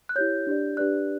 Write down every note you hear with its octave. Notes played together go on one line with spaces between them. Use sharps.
F#6
E4 G4 C#5 G6
D4 G4 D5
D4 G4 B4 D5 F#6